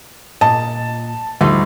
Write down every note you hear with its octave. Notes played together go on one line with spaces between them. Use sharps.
A#2 D#5 A5
D2 G3 D#4 F4